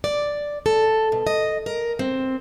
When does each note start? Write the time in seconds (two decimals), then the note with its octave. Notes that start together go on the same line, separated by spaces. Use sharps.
0.04 D5
0.66 A4
1.12 B2
1.27 D#5
1.66 A#4
1.99 C4